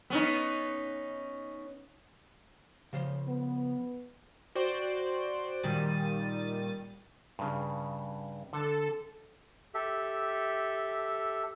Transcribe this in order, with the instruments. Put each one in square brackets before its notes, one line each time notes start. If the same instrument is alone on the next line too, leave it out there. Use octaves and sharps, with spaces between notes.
[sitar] B3 C#4 D#4
[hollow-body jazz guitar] C#3 F3 C5
[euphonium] B3
[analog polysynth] F#4 C5 D5 G5
A#2 D#3 G3 A6 D#7
[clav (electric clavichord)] G2 C#3
[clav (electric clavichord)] D3 [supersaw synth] A4
[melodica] G4 A4 E5